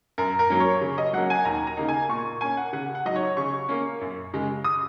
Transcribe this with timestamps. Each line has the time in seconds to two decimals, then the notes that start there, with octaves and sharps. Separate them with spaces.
0.18 F#2 A#4
0.39 A#4
0.50 F#3 A#3 C#4
0.60 C#5
0.81 C#3
0.98 D#5
1.13 F#3 A#3 C#4 F#5
1.30 G#5
1.45 D#2 A#5
1.67 A#5
1.77 C#3 A#3 D#4
1.89 G#5
2.09 A#2 C#6
2.41 A#3 C#4 G#5
2.57 F#5
2.73 C#3 F#5
2.95 F#5
3.05 F#3 D#4 D#5
3.16 C#5
3.37 C#3 C#6
3.69 A#3 C#4
4.01 F#2
4.34 C#3 G#3
4.64 D#6